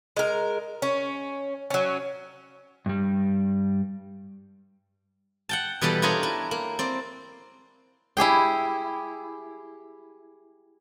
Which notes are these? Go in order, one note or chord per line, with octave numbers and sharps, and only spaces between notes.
G#3 A#4
C#4
F#3 C#4
G2 G3
F#5 G5 A5
B2 E3 G3 B3 G4 A4
D4 E4 F4 A#4 C#5 D#5
E4
A#3
C4 D5
E4 G4 G#4 G5